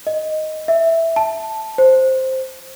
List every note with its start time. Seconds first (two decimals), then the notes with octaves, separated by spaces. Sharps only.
0.07 D#5
0.68 E5
1.16 A5
1.78 C5